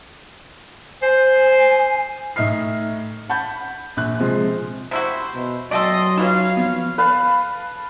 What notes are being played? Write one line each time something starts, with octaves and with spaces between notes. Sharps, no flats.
C5 G#5
A2 D#4 E5 F6 C7
F#5 A5 B5 G6
A#1 F#6
C3 F3 G#3
C3 E4 F#4 C5
B2
F#3 A3 A4 D5 D#5 G5 G#5 C6
E3 D#4 F4 B4 C#5 F5
F3 B3
B4 F5 A5